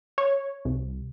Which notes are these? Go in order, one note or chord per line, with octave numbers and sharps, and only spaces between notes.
C#5
C2